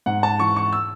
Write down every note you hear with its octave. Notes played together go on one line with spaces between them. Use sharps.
G#2 F#5
A5
E3 C#6
C#6
E6